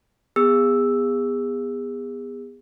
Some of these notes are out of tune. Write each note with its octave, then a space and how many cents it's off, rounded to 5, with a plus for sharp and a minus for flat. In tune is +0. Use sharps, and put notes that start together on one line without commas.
B3 +0 G#4 -30 E6 +0